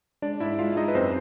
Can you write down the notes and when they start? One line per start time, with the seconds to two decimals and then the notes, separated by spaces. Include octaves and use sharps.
0.22 G#3 D4 D5
0.40 G#2 E4 E5
0.59 G#3 F4 F5
0.77 G#3 D#4 D#5
0.88 B4
0.95 F#2 C4 C5